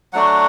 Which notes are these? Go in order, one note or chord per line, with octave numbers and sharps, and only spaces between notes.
F#3 A3 D4 F#4 F#5